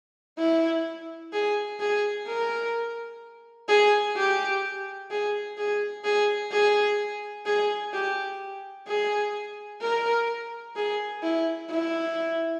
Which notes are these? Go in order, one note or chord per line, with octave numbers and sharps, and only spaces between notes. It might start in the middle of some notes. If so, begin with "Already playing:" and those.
E4
G#4
G#4
A#4
G#4
G4
G#4
G#4
G#4
G#4
G#4
G4
G#4
A#4
G#4
E4
E4